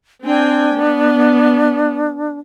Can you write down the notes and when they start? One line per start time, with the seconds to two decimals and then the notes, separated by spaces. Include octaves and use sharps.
0.24 C4 D4 G5 G#5
0.75 B3